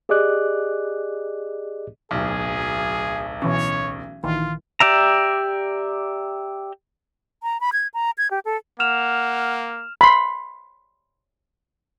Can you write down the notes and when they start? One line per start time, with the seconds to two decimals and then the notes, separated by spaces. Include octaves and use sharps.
0.09 G4 G#4 D5 D#5 D6 F#6
2.11 D1 B1 G#4
3.42 B2 E3 C#4 C#5
4.23 A#1 D#3 E3 F4
4.80 G4 D5 E5 A#5
7.43 A#5
7.61 B5
7.73 G#6
7.94 A#5
8.18 G#6
8.31 G4
8.45 A4
8.80 A#3 F#5 F6 E7 F7
10.01 B5 C6